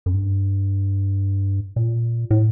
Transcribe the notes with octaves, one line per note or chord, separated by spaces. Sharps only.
F#2
G2
A#2
A2